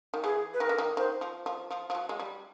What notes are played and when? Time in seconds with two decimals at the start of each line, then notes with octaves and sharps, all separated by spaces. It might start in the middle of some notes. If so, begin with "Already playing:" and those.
0.14 D#3
0.24 E3 G#4
0.54 B4
0.60 D#3 A#4
0.69 D3
0.78 D#3
0.97 D#3 C5
1.21 F3
1.46 F3
1.70 F3
1.90 F3
1.95 F#3
2.09 G#3
2.19 G3